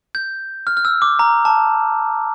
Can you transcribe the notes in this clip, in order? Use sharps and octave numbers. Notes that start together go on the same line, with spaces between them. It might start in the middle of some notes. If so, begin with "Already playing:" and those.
G6
F6
F6
E6
D6
A#5
A5